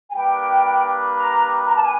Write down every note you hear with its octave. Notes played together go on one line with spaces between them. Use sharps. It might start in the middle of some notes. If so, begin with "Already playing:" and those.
G#5
G3 A#3 D4 G4 B4 G5
A#5
A#5
A5
G#5